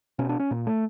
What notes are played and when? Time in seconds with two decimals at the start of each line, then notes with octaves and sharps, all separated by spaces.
0.19 B2 C#4
0.29 D4
0.40 C#4
0.51 A#2
0.67 A3